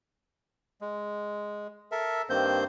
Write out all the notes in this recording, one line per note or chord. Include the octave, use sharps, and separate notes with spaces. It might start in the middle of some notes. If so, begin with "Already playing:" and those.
G#3
A4 A#4 E5
G2 D#3 A#3 C4 C5 G6